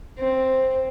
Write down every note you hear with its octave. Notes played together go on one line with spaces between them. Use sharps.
C4